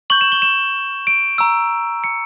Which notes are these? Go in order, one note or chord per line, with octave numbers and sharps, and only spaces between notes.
C#6 G6 F#7
E7
G7
E7
D7
A#5 C#6 E6
C#7